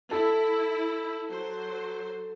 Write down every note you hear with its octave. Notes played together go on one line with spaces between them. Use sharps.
E4 A4
F#3 C5